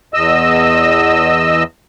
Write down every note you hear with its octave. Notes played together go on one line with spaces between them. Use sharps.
E2 D#5 E6